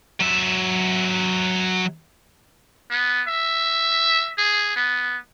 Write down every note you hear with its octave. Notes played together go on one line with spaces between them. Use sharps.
F#3 E5
B3
E5
G#4
B3